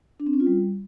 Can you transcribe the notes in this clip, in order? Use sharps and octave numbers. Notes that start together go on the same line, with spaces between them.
D4
C4
C#4
F4
G3